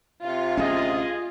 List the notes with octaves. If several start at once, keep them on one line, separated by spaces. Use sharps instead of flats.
C3 F4
D2 A#3 C#4 G#4 D#5